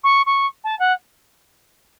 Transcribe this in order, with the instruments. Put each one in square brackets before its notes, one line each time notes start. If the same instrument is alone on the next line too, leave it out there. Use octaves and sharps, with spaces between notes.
[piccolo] C#6
C#6
A5
F#5